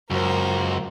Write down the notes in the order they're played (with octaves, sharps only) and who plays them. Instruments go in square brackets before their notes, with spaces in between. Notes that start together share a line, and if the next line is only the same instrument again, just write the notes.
[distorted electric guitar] C#2 [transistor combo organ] F#2 [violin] A#3 C5